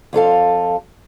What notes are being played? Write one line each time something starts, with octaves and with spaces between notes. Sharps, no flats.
F2 F4 A4 F5